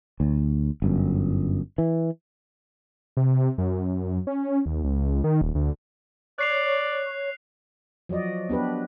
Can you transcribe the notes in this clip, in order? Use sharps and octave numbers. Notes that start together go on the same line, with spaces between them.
D2
G1 F#2
E3
C3
F#2
C#4
D#2
C#2
D#3
D#1
D2
C#5 D5 F#6 C7 F7
F3 F#3 F#4 D5 D#5
B3 D4 G4 B4